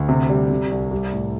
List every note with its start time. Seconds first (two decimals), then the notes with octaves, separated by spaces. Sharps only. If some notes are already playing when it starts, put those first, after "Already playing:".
Already playing: D2
0.09 C3
0.29 G3
0.50 C3
0.71 C2
0.91 G3
1.12 A2